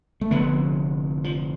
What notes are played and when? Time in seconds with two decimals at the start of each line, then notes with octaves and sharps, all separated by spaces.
0.21 A3
0.31 F1 F2 D3 B3
1.24 F3